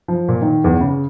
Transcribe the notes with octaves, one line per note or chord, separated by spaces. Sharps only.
F3
A#2
D#3
E2
C#3